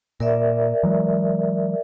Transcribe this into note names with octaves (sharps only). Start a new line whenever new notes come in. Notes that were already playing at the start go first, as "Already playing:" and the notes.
A#2 A#4 D5 E5
E3 F#3 G#3